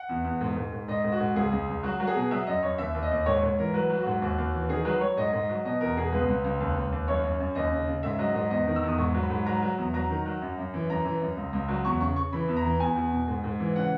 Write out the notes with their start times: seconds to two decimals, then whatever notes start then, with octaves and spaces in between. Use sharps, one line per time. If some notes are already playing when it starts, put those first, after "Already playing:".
Already playing: F#5
0.09 E2
0.24 E2
0.41 G#2
0.56 G#2
0.72 G#2
0.88 G#2 D#5
1.04 G#2
1.12 F#4
1.20 G#2
1.35 C#2 G#4
1.51 C#2
1.68 C#2
1.83 F#3 F#4
2.00 F#3
2.07 G#4
2.15 B2
2.31 F#3 E5
2.47 F#2 D#5
2.63 F#2 C#5
2.78 D#2 E5
2.94 D#2
3.02 D#5
3.11 D#2
3.26 G#2 C#5
3.42 G#2 C#5
3.58 E3 A#4
3.74 F#3 B4
3.90 F#3
3.98 F#4
4.06 G#2
4.22 D#2 F#4
4.38 D#2
4.54 E3
4.69 D#3 G#4
4.85 F#3 B4
5.01 F#3 C#5
5.17 G#2 D#5
5.33 G#2
5.49 F#3
5.65 B2 D#5
5.81 E2 A#4
5.97 B2 G#4
6.13 C#2 B4
6.29 C#2
6.44 C#2
6.60 D#2
6.76 D#2
6.92 D#2
7.08 F#2 C#5
7.23 F#2
7.40 F#2
7.55 D#2 D#5
7.72 C#3
7.87 C#3
8.03 G#2 E5
8.19 F#3 D#5
8.35 G#2 D#5
8.50 E2 D#5
8.66 D#3
8.76 E6
8.83 E2
8.88 D#6
8.98 G#2 C#6
9.14 F#3
9.23 B5
9.30 G#2
9.46 F#3 A#5
9.62 F#3
9.78 E2
9.94 F#3 A#5
10.10 D#3
10.26 F#3
10.42 F#2
10.58 F#2
10.74 E3
10.90 F#2 A#5
11.05 E3
11.21 F#2
11.37 C#2
11.53 C#2
11.68 F#3
11.85 E2 C#6
12.01 C#3 C#6
12.16 C#3 C#6
12.32 E3 B5
12.48 E2
12.56 A#5
12.64 E3
12.80 E2 G#5
12.96 E2
13.12 B2
13.28 G#2
13.44 G#2
13.60 E3
13.76 C#3 F#5